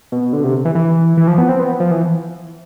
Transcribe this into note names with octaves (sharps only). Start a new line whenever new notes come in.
B2
D3
C3
E3
E3
E3
F3
B3
C4
B3
F3
E3